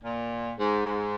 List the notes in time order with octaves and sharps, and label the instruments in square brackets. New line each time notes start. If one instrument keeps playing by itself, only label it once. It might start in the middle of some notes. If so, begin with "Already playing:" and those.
[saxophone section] A#2
G#2
G#2